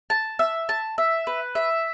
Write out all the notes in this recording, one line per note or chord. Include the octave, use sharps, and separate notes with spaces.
A5
E5
A5
E5
B4
E5